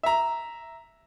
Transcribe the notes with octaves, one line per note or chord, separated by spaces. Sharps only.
E5 A#5